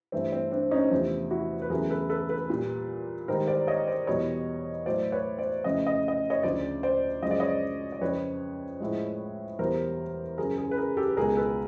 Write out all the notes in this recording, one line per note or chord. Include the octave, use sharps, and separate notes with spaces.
G2 E3 A3 C4
C4
C4 D4
C#4 D#4
E2 C3 F3 A3
E4 F#4
B4
E2 C#3 F#3 A3 G#4 A#4
A4 B4
A4 B4
A4 B4
A#2 G3
G#2 D#3 G3 A#4 C5
C5 D5
C#5 D#5
C5 D5
E2 B2 G3 C#5 D#5
A2 F#3 A3 C5 D5
B4 C#5
C5 D5
F2 C#3 F3 A3 D#5
D#5
D#5
C#5 D#5
D2 C#3 F3 C5 D5
C5 D5
F#2 C#3 F3 G#3 D#5
D5
C#5 D#5
D5
F2 C#3 F3 B4 C#5
A2 F3 G#3
E2 B2 G3 A#4 C5
F#2 C#3 F#3 G#4 A#4
G#4 A#4
B4
G#4 A#4
G4 A4
B4
C#2 B2 G#3 G#4 A#4
A4 B4